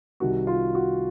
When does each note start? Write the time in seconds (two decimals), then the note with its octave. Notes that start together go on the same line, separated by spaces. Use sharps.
0.20 C2 C3 D#3 F#4
0.47 F4
0.75 F#4